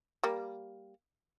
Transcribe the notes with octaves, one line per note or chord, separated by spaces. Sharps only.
G3 A#3